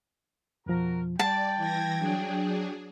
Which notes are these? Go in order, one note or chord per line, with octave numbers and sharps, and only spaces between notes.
F2 B2 F3 F#4 A#4 A#5
G3 D5 G5 A5
E3 G#6 A#6
F#3 D4 G#4